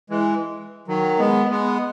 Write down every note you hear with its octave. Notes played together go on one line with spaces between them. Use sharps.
E3 G#3
D#3 F#3
G#3 B3
G#3 B3